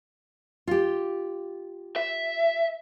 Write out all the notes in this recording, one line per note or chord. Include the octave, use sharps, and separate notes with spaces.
F4 G4
E5